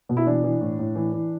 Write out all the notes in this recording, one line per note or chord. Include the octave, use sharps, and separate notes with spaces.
B2
E4
E3 D4
E3
A2
A2
E3
E3